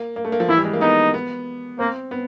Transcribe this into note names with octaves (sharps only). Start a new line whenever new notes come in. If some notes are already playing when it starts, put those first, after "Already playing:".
Already playing: A#3
A#3
A3
A#3
F3
E3 E4
G3
G#3
A#3
B3 D#4
B3
A#3 C4
B3